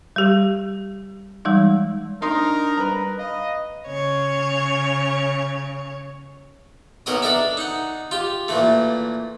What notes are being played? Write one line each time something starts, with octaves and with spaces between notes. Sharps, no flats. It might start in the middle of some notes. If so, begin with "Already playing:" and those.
G3 G4
E3 G3 G#3 D#4
D4 D#4 A#4 C6
G3 B4 A#5
D#5 F5
C#3 C#5
B1 B2 F#3 A#4 D#5 D#6
D4 A4 A#4 E5
D#4 F#5
F4 G4
A#2 E3 A3